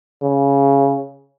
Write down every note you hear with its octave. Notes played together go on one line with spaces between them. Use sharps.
C#3